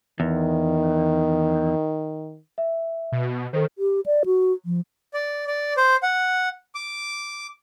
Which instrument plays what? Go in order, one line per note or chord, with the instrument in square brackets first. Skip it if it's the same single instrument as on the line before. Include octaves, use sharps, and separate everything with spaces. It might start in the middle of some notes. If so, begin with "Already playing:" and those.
[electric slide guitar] E2 [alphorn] D#3
[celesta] E5
[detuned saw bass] B2
[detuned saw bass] D#3 [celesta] A4 C5
[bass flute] G4
D5
F#4
F3
[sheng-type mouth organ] D5
D5
C5
F#5
D6